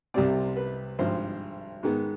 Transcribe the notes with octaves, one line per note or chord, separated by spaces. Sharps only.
C2 C3 G3 C4 D5
B4
G#1 G2 F3 C5
G#2 D#3 G#3 B3